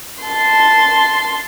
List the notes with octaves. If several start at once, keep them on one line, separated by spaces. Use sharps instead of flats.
A5 C6